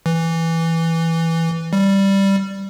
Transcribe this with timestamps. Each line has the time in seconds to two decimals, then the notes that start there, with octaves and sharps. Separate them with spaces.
0.06 E3
1.73 G3